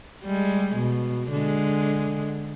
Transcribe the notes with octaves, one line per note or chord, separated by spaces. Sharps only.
G3 G#3
B2
D3 G#3